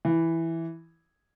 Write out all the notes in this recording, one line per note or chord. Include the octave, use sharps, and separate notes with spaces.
E3